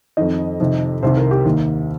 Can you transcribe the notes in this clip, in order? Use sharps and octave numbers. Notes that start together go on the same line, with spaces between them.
F2 D#3 D#5
F2 C3 D#3
C2 C3 D#3 C5
A#4
G4
D#2 D#3